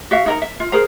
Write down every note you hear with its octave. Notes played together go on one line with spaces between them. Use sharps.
F#4 E5 F5
D#4 A#4 A#5
E5
F4
G#4 A#4 C5 A#5